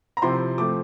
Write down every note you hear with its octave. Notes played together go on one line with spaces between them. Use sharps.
A#5
C3 F3 C4 E4 C6
F3 A3 C4 D6